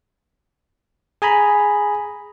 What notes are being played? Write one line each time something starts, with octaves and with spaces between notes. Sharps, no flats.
G#4 G#5 A#5 B5